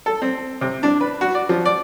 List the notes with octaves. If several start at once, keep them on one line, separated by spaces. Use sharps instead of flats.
A4
C4
C3
D4
B4
F#4
D5
F3
D5